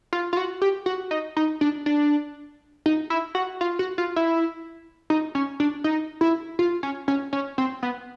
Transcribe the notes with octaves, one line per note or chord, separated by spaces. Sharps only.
F4
F4
F#4
G4
F#4
D#4
D#4
D4
D4
D#4
E4
F#4
F4
F#4
F4
E4
D#4
C#4
D4
D#4
E4
F4
C#4
C#4
C#4
C4
B3